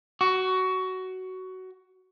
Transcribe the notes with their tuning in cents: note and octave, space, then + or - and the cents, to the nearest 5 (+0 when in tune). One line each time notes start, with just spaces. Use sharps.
F#4 +15